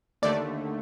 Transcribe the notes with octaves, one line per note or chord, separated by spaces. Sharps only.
D#2 D3 A3 D5